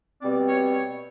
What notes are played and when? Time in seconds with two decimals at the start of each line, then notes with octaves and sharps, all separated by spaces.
0.21 B2 G3 C4 D5
0.46 C#5
0.72 C#5